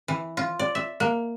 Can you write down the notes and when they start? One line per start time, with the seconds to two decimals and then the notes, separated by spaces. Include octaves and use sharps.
0.08 E3
0.37 F4
0.59 D5
0.75 E5
1.00 A#3